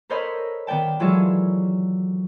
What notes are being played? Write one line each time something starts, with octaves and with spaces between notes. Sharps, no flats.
A4 A#4 C5 C#5 D#5 B5
D#3 B3 D5 G5 A5
E3 F#3 G#3 F4 G#4 A4